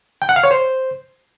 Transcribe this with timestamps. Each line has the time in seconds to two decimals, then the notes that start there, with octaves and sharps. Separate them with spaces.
0.22 G5
0.29 F#5
0.36 F5
0.44 C#5
0.51 C5